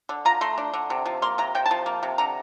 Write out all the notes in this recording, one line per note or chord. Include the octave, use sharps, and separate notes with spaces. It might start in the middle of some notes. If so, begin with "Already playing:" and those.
D3
F4 A#5
A3 C6
D4
D3
C3
F3
A#3 C6
C3 A#5
C3 G5
A5
F3
A#3
C3
D3 A#5